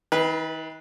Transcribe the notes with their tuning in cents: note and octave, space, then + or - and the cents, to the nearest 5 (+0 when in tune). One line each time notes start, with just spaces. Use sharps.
D#3 +45 B4 -10